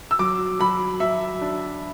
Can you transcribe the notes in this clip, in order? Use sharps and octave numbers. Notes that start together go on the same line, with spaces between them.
E6
F#3 D6
F#3 B5
F#3 E5
D4